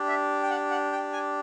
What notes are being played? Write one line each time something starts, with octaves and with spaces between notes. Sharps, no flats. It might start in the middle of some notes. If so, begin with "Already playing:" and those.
Already playing: D4 G4
E5
G5
F#5
F#5
G5
G#5